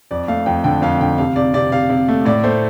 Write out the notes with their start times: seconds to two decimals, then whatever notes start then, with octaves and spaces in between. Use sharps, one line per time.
0.11 F2 D5
0.28 A3 F5
0.46 F2 G5
0.64 D3 G5
0.82 F2 F5
1.00 D3 G5
1.18 C3 F5
1.36 C3 D5
1.54 C3 D5
1.72 C3 F5
1.90 C3
2.08 A3
2.25 A2 D5
2.43 A3 C5